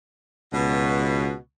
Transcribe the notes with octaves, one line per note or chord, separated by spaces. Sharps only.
C#2 B2